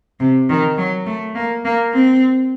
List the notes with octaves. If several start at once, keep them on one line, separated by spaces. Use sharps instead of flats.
C3
D#3
F#3
A3
A#3
A#3
C4